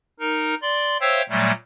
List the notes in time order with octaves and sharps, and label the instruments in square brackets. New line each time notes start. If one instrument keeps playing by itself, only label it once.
[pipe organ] D#4 A#4
D5 C6
C5 C#5 E5 F5 G5 E6
A#2 F#3 G3 A3